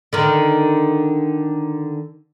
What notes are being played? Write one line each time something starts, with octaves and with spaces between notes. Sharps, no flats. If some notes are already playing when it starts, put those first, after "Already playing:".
D3 D#3